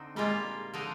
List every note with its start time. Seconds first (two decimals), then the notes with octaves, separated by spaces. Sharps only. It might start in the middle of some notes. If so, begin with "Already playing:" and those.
Already playing: D3 C4 D#4
0.16 A#2 G3 G#3 A#3 F4
0.74 D3 F3 G#3 D#4